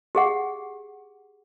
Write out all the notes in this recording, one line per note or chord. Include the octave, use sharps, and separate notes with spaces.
G4 G#4 F#5